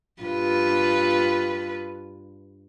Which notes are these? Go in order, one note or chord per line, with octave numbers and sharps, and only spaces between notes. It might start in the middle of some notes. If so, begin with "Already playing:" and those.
G2 F4 B4